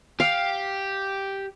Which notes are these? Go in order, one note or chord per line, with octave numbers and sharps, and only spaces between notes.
G4 F5